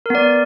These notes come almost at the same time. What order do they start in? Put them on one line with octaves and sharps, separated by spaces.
A#4 B3 D5